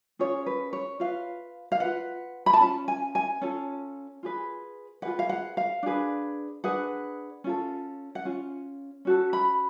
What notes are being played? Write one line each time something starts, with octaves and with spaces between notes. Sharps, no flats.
C#4 F4 G#4 C#5
B4
C#5
F4 B4 F5
F5
F4 B4 F#5
B5
A5
C#4 F4
G#5
G#5
C#4 F4 A4
F4 G#4 B4
F4 G#4 B4 F#5
F5
F#5
F5
D4 G#4 B4
D4 G#4 B4 F#5
C#4 F4 A4
F#5
C#4 F4
C#4 F#4 A4
B5